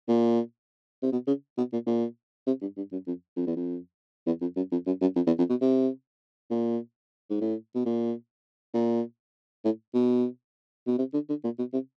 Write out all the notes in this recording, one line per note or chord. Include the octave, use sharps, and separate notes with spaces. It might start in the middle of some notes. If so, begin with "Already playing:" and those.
A#2
C3
B2
C#3
B2
A#2
A#2
C3
G2
G2
F#2
F2
F2
E2
F2
E2
F2
F#2
F2
F#2
F#2
F2
E2
F2
B2
C3
A#2
G#2
A2
B2
A#2
A#2
A2
B2
B2
C3
D3
D3
A#2
B2
C3